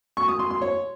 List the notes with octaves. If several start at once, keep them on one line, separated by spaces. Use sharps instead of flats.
C#6
D#6
C6
C6
C#5